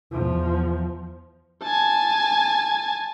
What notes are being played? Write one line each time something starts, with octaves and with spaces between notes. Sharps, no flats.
E2 F3
G#5 A5